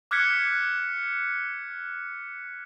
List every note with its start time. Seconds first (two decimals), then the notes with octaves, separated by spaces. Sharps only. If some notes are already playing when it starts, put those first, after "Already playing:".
0.11 D6 F6 F#6 G#6 B6 C#7